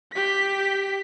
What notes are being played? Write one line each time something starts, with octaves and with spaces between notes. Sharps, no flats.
G4 B6